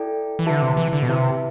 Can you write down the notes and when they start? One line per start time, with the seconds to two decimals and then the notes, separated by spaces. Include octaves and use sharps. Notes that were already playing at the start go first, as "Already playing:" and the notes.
Already playing: E4 A4 D5 G5
0.39 E3
0.46 D3 E4 G4 B4 E5 A5
0.62 C3
0.77 E3
0.93 D3
1.03 B2
1.09 C3 E4 G4 B4 E5 A5